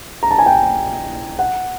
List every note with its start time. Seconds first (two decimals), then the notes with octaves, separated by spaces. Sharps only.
0.23 A#5
0.31 A5
0.39 G#5
0.46 G5
1.39 F#5